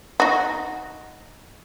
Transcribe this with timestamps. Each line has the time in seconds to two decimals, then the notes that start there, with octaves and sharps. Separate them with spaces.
0.20 D#4 F#4